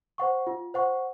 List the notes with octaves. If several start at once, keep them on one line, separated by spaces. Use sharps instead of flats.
C5 F#5 C#6
F4
C5 F#5 C#6